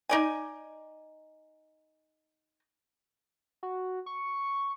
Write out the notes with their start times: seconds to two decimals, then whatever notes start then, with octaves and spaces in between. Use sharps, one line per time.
0.09 D#4 D5 G#5
3.63 F#4
4.06 C#6